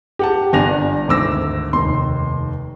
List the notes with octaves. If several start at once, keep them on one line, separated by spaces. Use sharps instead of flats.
G4 F#5 A5
G1 D4 G#5 A#6 F7
G#1 D2 D6 E6 A#6
F1 D#2 C6